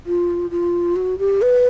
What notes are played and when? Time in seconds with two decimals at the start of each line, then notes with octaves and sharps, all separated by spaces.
0.06 F4
0.51 F4
0.96 F#4
1.19 G4
1.42 B4